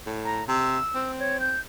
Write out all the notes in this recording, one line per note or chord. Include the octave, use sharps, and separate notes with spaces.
A2
A#5
C3 E6
C4
C#5
G6